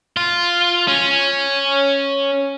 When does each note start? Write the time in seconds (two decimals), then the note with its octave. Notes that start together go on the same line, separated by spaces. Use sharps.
0.17 F4
0.88 C#4